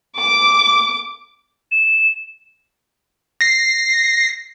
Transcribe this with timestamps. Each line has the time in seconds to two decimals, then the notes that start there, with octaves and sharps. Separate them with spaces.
0.19 D6
1.71 E7
3.41 A#6 C7